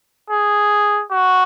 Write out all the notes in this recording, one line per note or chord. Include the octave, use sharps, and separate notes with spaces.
G#4
F#4